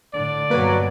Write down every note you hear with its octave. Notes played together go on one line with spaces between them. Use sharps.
A2 D3 D5
G2 B2 F#3 A#3 B4 G#6